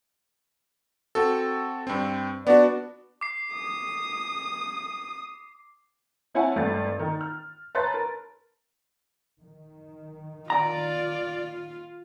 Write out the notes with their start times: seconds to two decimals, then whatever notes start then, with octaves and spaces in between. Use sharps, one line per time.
1.15 C4 F#4 A4
1.87 G2 C4
2.47 B3 D4 F#4 D5
3.21 D6 C7
3.53 D#6
6.34 C4 E4 C#5 F#5 G#5 A5
6.56 G#1 G2 A3 A6
6.99 D#3
7.21 F6
7.75 B4 C#5 A5 A#5 C6 A6
7.94 A#4
9.42 D#3
10.50 F4 D5 A#5